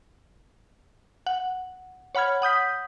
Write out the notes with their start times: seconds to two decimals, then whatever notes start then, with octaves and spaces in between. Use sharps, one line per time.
1.26 F#5
2.15 C#5 F#5 B5 F6 G#6
2.42 F#5 D#6 G6 B6